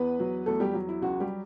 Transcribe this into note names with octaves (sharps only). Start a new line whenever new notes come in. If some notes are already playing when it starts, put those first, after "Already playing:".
Already playing: E2 B3 B4
F#3
E2 A3 A4
G3 G4
F#3
E4
C#2 F#4
G3 G4